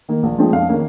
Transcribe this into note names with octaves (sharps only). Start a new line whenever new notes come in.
D#3 A#3
A#1
A#2 F3 G#3 C4
F2 F5
D#3 A#3 C#4